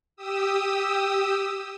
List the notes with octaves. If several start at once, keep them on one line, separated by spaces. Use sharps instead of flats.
G4 D#6 E6